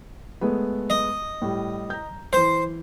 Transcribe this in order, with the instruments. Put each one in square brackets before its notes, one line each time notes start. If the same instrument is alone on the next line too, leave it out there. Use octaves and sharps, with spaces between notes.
[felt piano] G#3 A3 B3
[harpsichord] D#5
[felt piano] A2 G3
A#5 G6
[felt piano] E3 G6 [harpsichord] C5